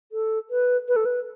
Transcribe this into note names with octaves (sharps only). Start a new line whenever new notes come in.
A4
B4
B4
A4
B4